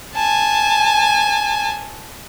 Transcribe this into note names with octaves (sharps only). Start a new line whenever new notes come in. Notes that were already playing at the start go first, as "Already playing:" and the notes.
G#5 A5